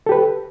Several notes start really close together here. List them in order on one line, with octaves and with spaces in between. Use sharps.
A4 G4 B4